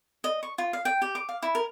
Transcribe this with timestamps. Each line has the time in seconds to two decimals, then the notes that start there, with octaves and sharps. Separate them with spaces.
0.24 D#5
0.43 C#6
0.58 F4
0.73 F5
0.85 G5
1.02 G4
1.15 D6
1.29 F5
1.43 E4
1.55 A#4